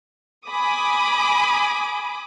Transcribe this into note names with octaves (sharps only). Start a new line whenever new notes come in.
G#5 B5 D6 D#6